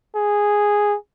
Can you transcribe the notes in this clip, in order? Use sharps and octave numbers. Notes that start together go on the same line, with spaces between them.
G#4